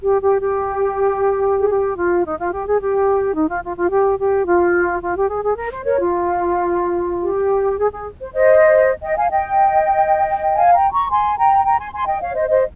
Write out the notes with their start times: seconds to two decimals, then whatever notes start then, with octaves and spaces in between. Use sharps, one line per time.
0.02 G4
0.21 G4
0.39 G4
1.59 G#4
1.69 G4
1.97 F4
2.24 D#4
2.39 F4
2.52 G4
2.66 G#4
2.80 G4
3.35 D#4
3.48 F4
3.63 F4
3.76 F4
3.90 G4
4.18 G4
4.45 F4
5.02 F4
5.15 G4
5.29 G#4
5.42 G#4
5.56 A#4
5.71 C5
5.84 A#4 C#5
5.98 F4
7.23 G4
7.77 G#4
7.91 G#4
8.20 C5
8.33 C5 D#5
9.02 D#5 G5
9.16 F5 G#5
9.30 D#5 G5
10.54 F5 G#5
10.73 G5 A#5
10.91 A#5 C#6
11.10 G#5 C6
11.38 G5 A#5
11.65 G5 A#5
11.79 G#5 C6
11.93 G#5 C6
12.07 D#5 G5
12.21 C#5 F5
12.34 C5 D#5
12.49 C5 D#5